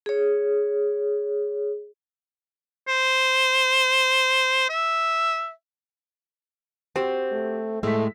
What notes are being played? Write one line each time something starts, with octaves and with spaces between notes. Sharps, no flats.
G#4 C#5
C5
E5
C4 F#4 G4 C5
A3
A2 G#3 A3 E6 B6